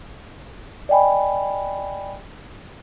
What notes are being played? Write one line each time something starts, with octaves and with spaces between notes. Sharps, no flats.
D5 D#5 G5 G#5 B5